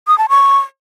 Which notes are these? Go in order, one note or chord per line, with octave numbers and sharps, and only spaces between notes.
D#6
A5
C#6